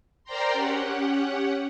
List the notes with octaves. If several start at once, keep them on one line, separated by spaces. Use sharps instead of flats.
A#4 C5 D5 G5 A#5 C6
C#4 G4 F#5